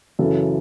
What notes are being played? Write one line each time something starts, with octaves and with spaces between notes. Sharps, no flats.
F#2 C#3 E3 A4